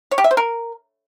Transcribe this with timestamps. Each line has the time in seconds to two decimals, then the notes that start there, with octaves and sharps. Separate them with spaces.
0.11 C#5
0.18 G4
0.24 E5
0.31 C5
0.37 A#4